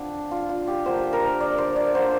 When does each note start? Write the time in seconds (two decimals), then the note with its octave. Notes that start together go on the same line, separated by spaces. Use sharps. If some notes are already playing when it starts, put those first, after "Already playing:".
Already playing: D3 F3 C4 D4
0.31 F4
0.49 F4
0.68 G4
0.86 D3 F3 A#3 C5
1.13 A#4
1.40 D5
1.58 C5
1.76 D5
1.94 D3 A#3 C5